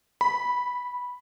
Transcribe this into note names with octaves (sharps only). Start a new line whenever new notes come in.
B5